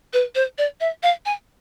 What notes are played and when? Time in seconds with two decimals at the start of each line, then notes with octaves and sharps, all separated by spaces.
0.13 B4
0.35 C5
0.58 D5
0.80 E5
1.03 F5
1.25 G#5